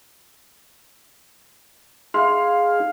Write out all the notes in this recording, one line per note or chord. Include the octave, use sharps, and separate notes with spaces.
D#4 G#4 F5 C6